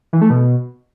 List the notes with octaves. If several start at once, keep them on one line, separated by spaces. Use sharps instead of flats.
E3
A3
B2